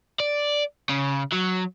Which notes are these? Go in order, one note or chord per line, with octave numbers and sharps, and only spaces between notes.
D5
C#3
F#3